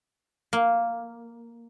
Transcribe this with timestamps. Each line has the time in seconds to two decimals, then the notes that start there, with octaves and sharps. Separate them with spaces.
0.53 A#3